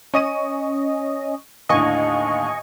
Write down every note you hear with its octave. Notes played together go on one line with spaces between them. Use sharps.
C#4 D#5 C#6 D#7
D#2 A2 D3 D#5 G#5 C#6